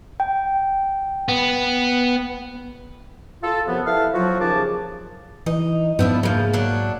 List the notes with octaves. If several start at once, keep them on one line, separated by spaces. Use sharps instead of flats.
G5
B3
F4 A4
F#2 C3 F3 B3
E4 A4 B4 E5 F5
F3 F#3 F#4
D#2 C#3 F3 G#4 A5 D6
E3 D#4
G#2 F3 B3 D4 E4
C#3 F3 A#3
F#3 D4